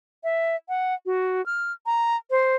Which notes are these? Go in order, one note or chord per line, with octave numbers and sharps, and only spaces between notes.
E5
F#5
F#4
F6
A#5
C5